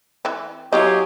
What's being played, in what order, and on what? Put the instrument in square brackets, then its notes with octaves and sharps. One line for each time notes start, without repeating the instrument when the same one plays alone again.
[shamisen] E3 C4
[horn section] F#3 G#4 [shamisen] E4 F4 D#5 [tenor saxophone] G4 [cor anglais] C#5